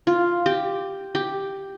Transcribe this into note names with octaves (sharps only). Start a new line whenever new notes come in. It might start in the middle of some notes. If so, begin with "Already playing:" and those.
F4
G4
G4